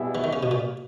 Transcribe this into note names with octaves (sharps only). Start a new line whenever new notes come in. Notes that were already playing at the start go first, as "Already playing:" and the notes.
Already playing: B2 G3 B3 E4 G#4
E3
D#3
C#3
B2
A#2